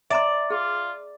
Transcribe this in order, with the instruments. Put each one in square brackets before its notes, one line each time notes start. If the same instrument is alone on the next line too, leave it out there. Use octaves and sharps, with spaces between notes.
[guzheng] D5 [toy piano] E5 A#5 C6
[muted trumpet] F4 [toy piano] G#4